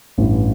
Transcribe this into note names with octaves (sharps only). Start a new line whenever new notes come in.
A1 G2 E3